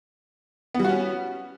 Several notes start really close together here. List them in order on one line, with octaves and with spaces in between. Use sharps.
B3 G3 F#4 C#4